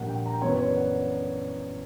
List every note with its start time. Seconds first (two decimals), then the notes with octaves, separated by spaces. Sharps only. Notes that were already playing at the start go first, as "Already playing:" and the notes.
Already playing: A#1 A#2 G3 A#3 F#5
0.09 G5
0.26 A#5
0.34 G5
0.42 F#2 E3 B3 C#5
0.50 B4
0.58 C#5
0.68 D5
0.76 F#5